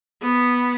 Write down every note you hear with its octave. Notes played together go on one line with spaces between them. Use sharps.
B3